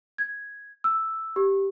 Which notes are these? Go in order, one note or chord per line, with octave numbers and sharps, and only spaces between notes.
G#6
E6
G4